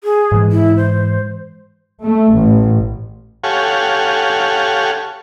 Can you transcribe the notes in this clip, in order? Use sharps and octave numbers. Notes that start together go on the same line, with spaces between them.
G#4
G#2 E3 G#3
E4
C5
A3
A1
G4 A4 C#5 F5 F#5 G#5